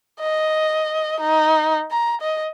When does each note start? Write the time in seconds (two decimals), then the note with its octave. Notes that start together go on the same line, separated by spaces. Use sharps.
0.21 D#5
1.20 D#4
1.91 A#5
2.21 D#5